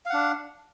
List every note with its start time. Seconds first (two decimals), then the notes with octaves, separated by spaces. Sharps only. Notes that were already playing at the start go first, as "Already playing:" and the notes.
0.06 F5
0.10 F#5
0.14 D4